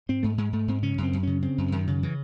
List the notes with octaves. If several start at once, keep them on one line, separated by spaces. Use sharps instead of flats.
G#2 C4
G#2 A3
G#2 G#3
G#2 A3
G#2 C4
C#3 C#4
F#2 C4
F#2
C#3 C#4
C#3 C4
F#2
F#2 D#3
C#3
C#3 E3